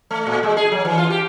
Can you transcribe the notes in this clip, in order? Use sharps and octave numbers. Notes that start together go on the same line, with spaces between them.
A3
A#2
G#3
G#4
F#3
E3
F4
G4